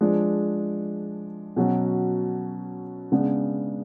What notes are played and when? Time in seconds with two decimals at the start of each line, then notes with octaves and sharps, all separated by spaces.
0.01 F3 G#3 D4
1.56 B2 F#3 C#4
3.12 C#3 G#3 B3 D4